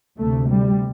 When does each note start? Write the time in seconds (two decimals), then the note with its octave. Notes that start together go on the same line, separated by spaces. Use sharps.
0.18 D2 C3 A3
0.51 G3